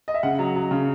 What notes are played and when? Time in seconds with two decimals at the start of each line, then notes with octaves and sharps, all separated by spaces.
0.08 D#5
0.14 E5
0.23 C#3 F#5
0.39 F#3
0.55 F#3
0.71 C#3